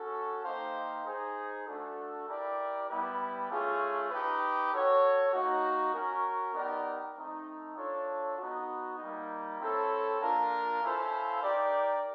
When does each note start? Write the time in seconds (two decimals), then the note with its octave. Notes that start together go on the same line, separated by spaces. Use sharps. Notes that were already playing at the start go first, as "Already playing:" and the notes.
Already playing: C#4 F#4 A4
0.44 A#3 D#4 G4 C5 F5
1.05 D#4 G#4 C5
1.66 A3 D4 F#4 A4
2.28 E4 G4 A#4 D5
2.89 G3 B3 E4 G4 B4
3.50 A3 C#4 F4 G#4
4.10 D#4 G4 B4
4.72 F#4 A4 C#5
5.33 A#3 D#4 F#4
5.94 C#4 F#4 A#4
6.55 B3 D#4 G4 A#4 D5
7.16 A3 C4 D#4
7.77 D4 F4 A4 C#5
8.37 B3 D#4 F#4
8.98 G3 A#3 D#4
9.60 C4 E4 A4 C#5
10.21 A#3 D4 F4 A#4
10.82 C#4 E4 A4 C5 F5
11.43 D#4 G4 A#4 D5